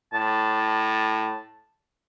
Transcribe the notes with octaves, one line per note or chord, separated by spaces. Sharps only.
A2 A5